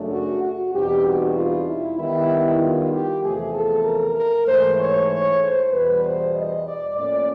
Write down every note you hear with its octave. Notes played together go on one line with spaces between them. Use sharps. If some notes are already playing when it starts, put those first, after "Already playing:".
Already playing: F#2 C#3 F#3 A3 D4
F#4
F#4
E2 B2 G3 C4 D#4 G4
F#4
F4
E4
D#3 G3 B3 D#4 E4
F4
G4
E2 C3 F3 A3 G#4
A4
A#4
A#4
G#2 E3 A3 C5
C#5
C#5
C5
E2 B2 G3 B4
C5
D#5
D5
A2 F3 A#3 C#4 D5